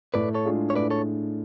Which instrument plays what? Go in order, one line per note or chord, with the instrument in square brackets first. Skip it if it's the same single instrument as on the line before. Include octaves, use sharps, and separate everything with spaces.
[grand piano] A2 [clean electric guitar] B4 D5
[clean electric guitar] A4 C#5
[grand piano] G#3 D4 F4 G#4
[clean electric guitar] C#5
[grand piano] A2 [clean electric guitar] B4 D5
[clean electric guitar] A4 C#5